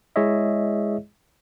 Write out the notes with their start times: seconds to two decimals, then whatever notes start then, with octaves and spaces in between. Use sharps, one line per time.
0.16 G#3 E4 G#4 C#5 D#5 E5